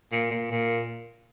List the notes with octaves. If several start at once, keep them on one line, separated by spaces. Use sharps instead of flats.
A#2
A#2
A#2